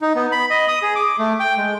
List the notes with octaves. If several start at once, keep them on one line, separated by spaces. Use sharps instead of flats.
D#4
B3
B5
D#5
D#6
G#4
D6
A3
G5
G#3